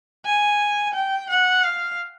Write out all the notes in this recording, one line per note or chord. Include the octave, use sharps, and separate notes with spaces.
G#5
G5
F#5
F5